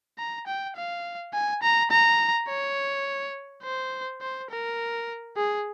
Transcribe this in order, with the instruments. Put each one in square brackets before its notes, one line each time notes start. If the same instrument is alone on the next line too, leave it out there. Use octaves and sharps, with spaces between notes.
[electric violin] A#5
G5
F5
G#5
A#5
A#5
C#5
C5
C5
A#4
G#4